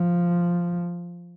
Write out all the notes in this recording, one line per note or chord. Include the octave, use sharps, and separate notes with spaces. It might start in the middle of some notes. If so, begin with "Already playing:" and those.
Already playing: F3